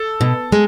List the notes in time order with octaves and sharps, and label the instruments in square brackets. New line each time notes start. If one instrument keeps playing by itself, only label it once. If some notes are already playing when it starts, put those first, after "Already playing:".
Already playing: [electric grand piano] A4
[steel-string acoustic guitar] B2
G#3